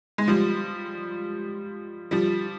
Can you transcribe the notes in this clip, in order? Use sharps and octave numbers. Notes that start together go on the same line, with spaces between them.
G#3
F3 G3
F3 G3